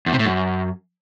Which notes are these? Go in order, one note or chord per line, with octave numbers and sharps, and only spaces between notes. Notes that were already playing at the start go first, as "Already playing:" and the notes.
E2
C3
A2
F#2